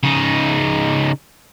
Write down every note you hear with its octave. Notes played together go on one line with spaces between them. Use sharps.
C#3 D#4